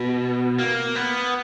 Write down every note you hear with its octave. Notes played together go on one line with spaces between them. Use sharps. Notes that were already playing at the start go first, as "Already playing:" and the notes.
Already playing: B2
A#3
B3